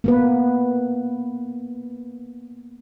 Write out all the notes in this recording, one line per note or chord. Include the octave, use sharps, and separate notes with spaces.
A#3 B3 B4